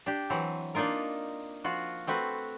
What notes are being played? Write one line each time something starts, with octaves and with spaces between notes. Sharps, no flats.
D4 G4
E3 F#3 C4
A#3 D4 D#4 F4 A#4
F3 F4 F#4
A3 C4 F#4 B4